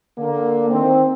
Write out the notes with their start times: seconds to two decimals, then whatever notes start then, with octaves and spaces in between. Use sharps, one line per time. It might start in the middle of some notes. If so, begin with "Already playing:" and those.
0.17 D3 A#3
0.70 D#3 C4